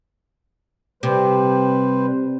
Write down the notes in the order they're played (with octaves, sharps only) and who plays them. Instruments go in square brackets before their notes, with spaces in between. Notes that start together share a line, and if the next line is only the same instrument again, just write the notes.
[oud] C3 [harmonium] G3 B4 C5